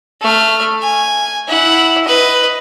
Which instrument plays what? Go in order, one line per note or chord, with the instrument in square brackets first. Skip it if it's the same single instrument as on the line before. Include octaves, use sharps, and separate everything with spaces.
[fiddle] A3 F6
G#5
E4 F#5
B4 D#5